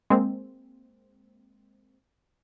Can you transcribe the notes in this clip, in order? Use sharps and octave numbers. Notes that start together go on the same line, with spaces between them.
G#3 A#3 C4